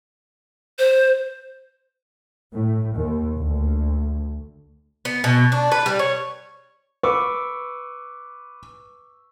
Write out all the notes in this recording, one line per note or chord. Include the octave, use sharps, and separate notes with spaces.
C5
A2
D#2
D2
B3
B2
D4
B4
G3
C#5
B4 C#6 D6 E6